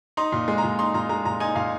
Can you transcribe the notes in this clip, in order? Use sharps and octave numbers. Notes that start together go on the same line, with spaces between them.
D#4 C6
A#2
G#3
A#5
A#2
D#4 C6
A#2 A#5
G#3 A#5
A#2 A#5
D#4 G#5
A#2 F5